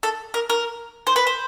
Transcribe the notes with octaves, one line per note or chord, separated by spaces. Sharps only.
A4
A#4
A#4
C5
B4
C5